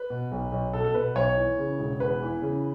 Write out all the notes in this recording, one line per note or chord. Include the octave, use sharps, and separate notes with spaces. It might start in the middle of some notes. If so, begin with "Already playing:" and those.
Already playing: B4
B2
B1
B1
B2 A4
A4
B2 B4
B1 C#5
E3
C#3
E1
E2 B4
E3
C#3